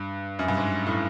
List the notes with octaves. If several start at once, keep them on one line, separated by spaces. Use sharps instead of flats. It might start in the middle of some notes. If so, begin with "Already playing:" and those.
Already playing: G2
F#2
G2
G#2
A2